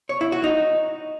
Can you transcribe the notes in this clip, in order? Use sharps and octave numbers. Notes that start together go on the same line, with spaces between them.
C#5
E4
F#4
D#4